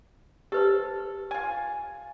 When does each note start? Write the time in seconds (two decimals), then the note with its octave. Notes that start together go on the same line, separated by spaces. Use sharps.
0.52 G4 A4 B4 C5
1.31 F4 G#5